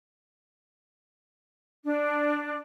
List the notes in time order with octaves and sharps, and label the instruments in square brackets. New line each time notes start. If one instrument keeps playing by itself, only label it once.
[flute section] D4